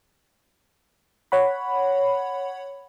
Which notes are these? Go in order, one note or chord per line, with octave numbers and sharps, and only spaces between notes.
C#5 F#5 B5